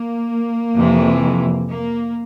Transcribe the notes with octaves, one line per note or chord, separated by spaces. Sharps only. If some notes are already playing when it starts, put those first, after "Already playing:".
Already playing: A#3
F2 C3 E3
A#3